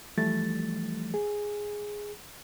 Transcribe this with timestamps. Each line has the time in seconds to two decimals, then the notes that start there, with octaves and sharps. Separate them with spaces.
0.17 E3 F3 G3 A3 A6
1.14 G#4